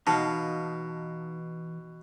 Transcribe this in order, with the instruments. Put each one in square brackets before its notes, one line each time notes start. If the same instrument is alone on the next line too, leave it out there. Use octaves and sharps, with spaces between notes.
[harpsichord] B2 [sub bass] E3 [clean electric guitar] D#4 F5 [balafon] A5